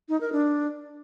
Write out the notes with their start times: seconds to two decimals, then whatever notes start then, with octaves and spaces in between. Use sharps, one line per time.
0.09 D#4
0.21 A#4
0.32 D4